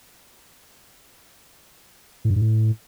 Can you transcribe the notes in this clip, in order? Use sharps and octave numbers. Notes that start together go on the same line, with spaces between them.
A2
G2
G#2
A2